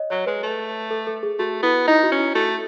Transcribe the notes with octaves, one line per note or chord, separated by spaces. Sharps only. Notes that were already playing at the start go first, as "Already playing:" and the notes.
Already playing: C#5 D#5
F#3 C#5
G#3 B4
A3
A4
A4
G#4
A3 F#4
B3 E4
D#4 E4
F#4
C#4
E4
A3 F#4